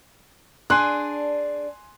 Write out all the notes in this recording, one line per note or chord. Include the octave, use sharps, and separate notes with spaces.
D4 G#4 G#5 C6 F#6